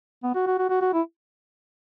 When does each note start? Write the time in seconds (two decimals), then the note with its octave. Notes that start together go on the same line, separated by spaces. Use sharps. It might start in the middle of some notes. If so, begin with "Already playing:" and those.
0.23 B3
0.35 F#4
0.47 F#4
0.59 F#4
0.69 F#4
0.81 F#4
0.93 E4